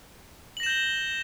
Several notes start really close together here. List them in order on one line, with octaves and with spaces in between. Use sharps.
F#7 A#6 E7 G6 G7